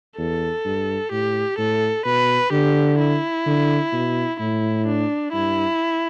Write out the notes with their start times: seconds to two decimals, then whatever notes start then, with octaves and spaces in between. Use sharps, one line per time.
0.18 E2 A4
0.65 G2
1.11 A2 G4
1.58 A2 A4
2.05 B2 B4
2.52 D3 G4
2.99 E4
3.46 D3
3.93 B2
4.40 A2 E4
4.87 D4
5.32 G2 E4